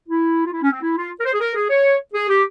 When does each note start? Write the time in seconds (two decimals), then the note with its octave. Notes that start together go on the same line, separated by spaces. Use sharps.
0.09 E4
0.46 F4
0.52 E4
0.63 C#4
0.72 C4
0.82 E4
0.97 F4
1.20 A#4
1.26 C5
1.34 G#4
1.41 A#4
1.56 G#4
1.70 C#5
2.14 G#4
2.30 G4